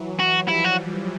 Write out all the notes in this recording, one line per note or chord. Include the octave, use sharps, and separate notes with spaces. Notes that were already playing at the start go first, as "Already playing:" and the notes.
Already playing: E3 F#3
F#4
F3 G3 E4
F#4